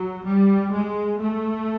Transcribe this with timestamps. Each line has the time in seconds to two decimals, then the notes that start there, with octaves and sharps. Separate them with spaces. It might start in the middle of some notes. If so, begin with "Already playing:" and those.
Already playing: F#3
0.25 G3
0.73 G#3
1.21 A3